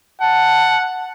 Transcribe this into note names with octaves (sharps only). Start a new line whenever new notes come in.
F#5 A5